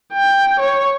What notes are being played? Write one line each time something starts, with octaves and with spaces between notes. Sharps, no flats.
G5
C#5